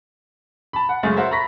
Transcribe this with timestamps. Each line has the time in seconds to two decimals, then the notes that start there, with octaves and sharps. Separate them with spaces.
0.73 A5 B5
0.89 F#5
1.03 F#2 C#3 G#3 A3 A6
1.17 F#4 A#4 C5 E5
1.31 A#5 B5 C#6 A#6 B6